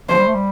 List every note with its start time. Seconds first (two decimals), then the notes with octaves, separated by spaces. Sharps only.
0.09 F3 C5
0.18 G3
0.27 A3
0.35 G3